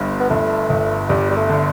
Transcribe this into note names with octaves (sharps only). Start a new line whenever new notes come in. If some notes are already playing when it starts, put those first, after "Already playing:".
Already playing: G1 G2
B3
G1 A3
G1
G1 G3
G3
A3
D3